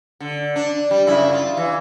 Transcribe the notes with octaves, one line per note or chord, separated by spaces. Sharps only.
D3
D4
G3
F#2 C#3 E4
F4
E3